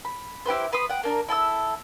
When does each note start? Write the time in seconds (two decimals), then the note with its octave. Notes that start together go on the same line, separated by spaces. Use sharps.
0.05 B5
0.46 E4 G4 B4 C5
0.73 B4 B5 C6 D#6
0.90 F#5 G5
1.04 A#3 D4 A#4
1.28 E4 A4 A5 E6